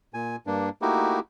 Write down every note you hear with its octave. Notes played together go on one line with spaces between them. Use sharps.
A#2 G#5
G2 A#3 D4
A3 A#3 D#4 E4 F#4 G4